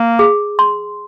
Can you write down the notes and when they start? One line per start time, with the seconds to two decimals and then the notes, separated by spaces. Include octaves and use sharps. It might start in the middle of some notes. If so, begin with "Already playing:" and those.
Already playing: A#3
0.19 G#4
0.59 C6